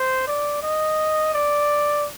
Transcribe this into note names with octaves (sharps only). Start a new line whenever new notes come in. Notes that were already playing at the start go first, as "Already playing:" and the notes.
Already playing: C5
D5
D#5
D5